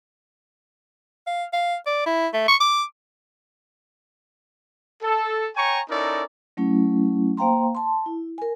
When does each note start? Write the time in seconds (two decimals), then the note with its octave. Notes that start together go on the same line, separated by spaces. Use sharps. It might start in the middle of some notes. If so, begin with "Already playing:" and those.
1.27 F5
1.53 F5
1.86 D5
2.06 E4
2.34 A3
2.48 C#6
2.61 D6
5.02 A4
5.56 C#5 G5 G#5 A#5 C#6
5.89 C#4 D#4 E4 A4 A#4 D5
6.57 F#3 A3 C#4 E4
7.37 A#3 C5 F5 G5 A#5 C6
7.75 A5 C6
8.06 E4
8.38 A#4 G#5